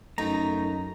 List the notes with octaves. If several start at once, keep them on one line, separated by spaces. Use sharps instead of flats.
F#2 A3 B3 D#4 A#5